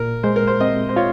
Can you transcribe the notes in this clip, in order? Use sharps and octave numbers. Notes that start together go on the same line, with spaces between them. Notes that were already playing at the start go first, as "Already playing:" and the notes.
Already playing: A#2 A#4
G#3 C5
A#4
C5
C4 D#5
C5
F4 C#5